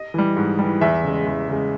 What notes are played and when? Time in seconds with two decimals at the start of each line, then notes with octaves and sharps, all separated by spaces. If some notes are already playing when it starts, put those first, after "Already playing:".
Already playing: D#5
0.14 E3 G3
0.37 G#2
0.59 E3 G3
0.81 E2 E5
1.03 C#3 G#3
1.26 E2
1.48 C#3 G#3